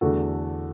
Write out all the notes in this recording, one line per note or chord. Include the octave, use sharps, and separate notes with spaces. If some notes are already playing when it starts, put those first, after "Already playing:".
E2 D3 A3 F#4 A4